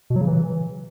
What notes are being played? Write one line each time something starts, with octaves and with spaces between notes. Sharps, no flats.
B2
F#3
C#3
E3